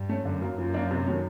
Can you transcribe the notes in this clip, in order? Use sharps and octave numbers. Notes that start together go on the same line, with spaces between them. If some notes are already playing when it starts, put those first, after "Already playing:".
Already playing: G2
A3 C#4
F#2 D3
F#3 A#3
F#2 F3
A#3 D4
C3
D#3 F#3 A3 C#4